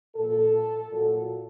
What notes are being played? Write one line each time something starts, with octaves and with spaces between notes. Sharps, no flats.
A#2 F3 A4
A#2 F#3